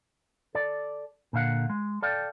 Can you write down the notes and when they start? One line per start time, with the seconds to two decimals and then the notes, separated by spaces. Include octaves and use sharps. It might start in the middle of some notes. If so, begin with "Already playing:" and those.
0.55 A4 D5
1.33 A#2 D3 F5 F#5
1.70 G#3
2.02 A4 D5 F5 G5